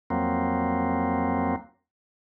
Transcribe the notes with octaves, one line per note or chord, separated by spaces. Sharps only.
F2 F#3 A#3 C4